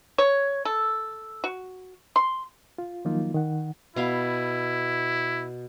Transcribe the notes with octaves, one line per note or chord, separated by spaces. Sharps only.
C#5
A4
F#4
C6
F4
D#3 F3 F#3 A#3 D#4 F4
D#3 F#5
B2 E4 F5 B5